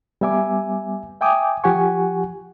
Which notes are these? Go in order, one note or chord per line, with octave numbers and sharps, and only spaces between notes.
G3 B3 E5 G#5 D6
E5 G5 G#5 D6 D#6
F3 G4 F#5 G#5 C#6